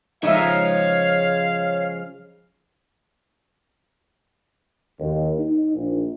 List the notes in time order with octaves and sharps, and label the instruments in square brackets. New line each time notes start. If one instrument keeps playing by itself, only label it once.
[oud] C#3 F3 G#3 [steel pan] D#4 E5 [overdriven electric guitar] C#5 [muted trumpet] F5
[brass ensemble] D#2
D#4
A#1